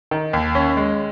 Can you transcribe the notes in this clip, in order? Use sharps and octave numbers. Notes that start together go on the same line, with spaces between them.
D#3
D#2
C#4
G#3